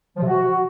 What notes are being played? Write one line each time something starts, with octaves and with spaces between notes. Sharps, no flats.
F3
C3
F#4